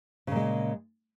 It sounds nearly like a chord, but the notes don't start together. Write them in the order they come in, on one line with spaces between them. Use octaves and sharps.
C#3 A#2 G#3